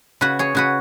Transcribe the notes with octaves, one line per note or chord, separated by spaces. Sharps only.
C#3 F#4 B4
G#4 C#5
C#3 F#4 B4